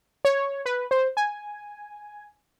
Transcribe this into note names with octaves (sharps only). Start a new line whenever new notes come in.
C#5
B4
C5
G#5